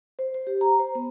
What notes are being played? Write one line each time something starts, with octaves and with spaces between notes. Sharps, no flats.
C5
C5
G4
A#5
C5
B3